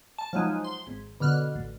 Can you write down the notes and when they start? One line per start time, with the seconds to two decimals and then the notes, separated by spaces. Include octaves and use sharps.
0.18 A5
0.33 F3 F#3 G#3 D#4
0.64 C6
0.87 G#1
1.20 B2 D3 F6 F#6
1.55 A1